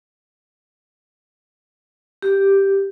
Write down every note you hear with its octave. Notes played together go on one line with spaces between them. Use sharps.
G4